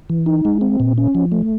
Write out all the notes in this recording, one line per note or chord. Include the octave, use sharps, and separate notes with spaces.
E3
D#4
G#3
C4
A#2
C#4
F3
A3